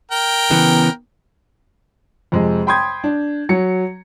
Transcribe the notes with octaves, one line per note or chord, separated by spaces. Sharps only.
A#4 G5
C#3 E3 B3
F2 C3 G#3
G5 B5 C6 D#6 G6 G#6
D4
F#3 C#7